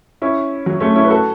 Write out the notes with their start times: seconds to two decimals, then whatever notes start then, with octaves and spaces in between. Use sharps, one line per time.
0.22 C#4 E4
0.66 F#3
0.80 A3 C#4
0.96 C#4 E4
1.04 B4
1.10 F#4 A4